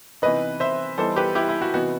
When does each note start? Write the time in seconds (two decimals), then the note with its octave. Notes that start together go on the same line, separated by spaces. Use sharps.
0.22 C3 E3 B3 D#4 B4 D#5
0.60 C5 E5
0.98 E3 G3 B3 D#4 A4 C5
1.16 G4 B4
1.35 E4 G4
1.49 E4
1.61 F#4
1.73 C3 E3 B3 D#4 F#4